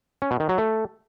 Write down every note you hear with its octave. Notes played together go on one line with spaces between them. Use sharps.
C#4
B2
D#3
F#3
A3